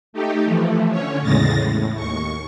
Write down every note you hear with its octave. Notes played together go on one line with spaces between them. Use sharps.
A3 D#4 G4
E3 F3 A3
D3 C#4 C#5
E2 A2 C#3 G#3 A6 A#6
A2
D#2 C#6